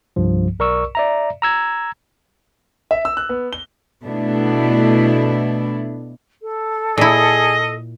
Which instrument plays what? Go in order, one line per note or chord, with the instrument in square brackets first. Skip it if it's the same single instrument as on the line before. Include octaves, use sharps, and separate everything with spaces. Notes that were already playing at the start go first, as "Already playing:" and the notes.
[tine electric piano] C2 G2 F3
B1 A#4 D5 C#6 E6
D5 E5 A#5
A#5 E6 G#6
[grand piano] E5
E6
F#6
B3
G7
[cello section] B2 A3 B3 D4 E4
[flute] A4
[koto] A#2 E4 [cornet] G#4 [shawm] D#5